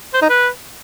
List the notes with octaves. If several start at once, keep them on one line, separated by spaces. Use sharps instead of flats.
C5
D#4
B4